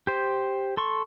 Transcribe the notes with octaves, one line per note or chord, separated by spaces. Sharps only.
G4 C5
A4 C6 C#6